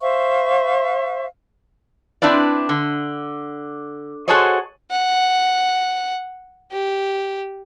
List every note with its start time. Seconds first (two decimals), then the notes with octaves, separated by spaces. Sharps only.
0.01 C5 E5 F5 C#6
2.22 C4 D4 E4 B4 D5
2.69 D3
4.28 F#4 G#4 A4 C5 C#5 D#5
4.90 F#5
6.72 G4